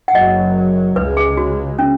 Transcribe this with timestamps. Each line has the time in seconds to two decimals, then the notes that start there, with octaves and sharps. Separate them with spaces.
0.08 F#5
0.15 F#1 F#2 F#3 D#5
0.96 C#2 C#3 G#3 B4
1.17 G#4
1.37 F#4
1.79 C#4